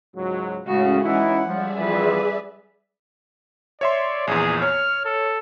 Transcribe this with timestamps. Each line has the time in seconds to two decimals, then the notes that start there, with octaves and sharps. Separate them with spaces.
0.16 C#2 G#2 F#3
0.67 A2 C#3 G#3 C#4 F#4
1.02 E3 D#4 E4 F#5
1.47 F3 G3 G#4 D5 E5
1.78 F2 E3 F3 B4
3.81 C#5 D5 E5 C6
4.27 A#1 E2 G#4
4.62 C#5 F6
5.05 A4